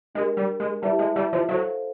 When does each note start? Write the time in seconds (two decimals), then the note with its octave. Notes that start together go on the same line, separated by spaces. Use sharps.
0.15 G#3 D4 G4 A#4
0.37 G3
0.60 G#3
0.82 G3 E4 G4 B4 E5 A5
0.99 G#3
1.16 G3
1.33 F3
1.49 F#3 A4 C5 F5